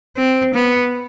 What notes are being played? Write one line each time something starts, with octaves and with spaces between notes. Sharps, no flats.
C4
B3